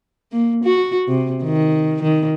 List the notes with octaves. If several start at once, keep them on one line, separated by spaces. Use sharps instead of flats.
A#3
F#4
C3
D#3
D#3